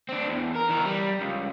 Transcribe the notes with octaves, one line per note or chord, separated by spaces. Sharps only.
C4 D4
E2
A#4
E3 A#4
G3
C#2